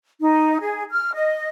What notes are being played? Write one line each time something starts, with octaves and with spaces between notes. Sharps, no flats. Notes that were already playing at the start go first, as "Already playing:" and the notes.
D#4
G#4
F6
D#5